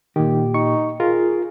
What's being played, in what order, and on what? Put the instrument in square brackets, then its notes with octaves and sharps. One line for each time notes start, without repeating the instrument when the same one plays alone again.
[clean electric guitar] A#2 G4 [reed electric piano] D#3
[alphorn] D#4 [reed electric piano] C#6
[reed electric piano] F4 [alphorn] G#4 [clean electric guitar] A#4